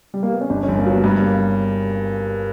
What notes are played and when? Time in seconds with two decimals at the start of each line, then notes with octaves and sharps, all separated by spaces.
0.14 G3
0.23 A#3
0.33 B3
0.41 C#4
0.50 G1 D4
0.63 C#4
0.68 G1
0.77 A#3
0.86 F#3 B3
1.04 G2 B3
1.22 A#3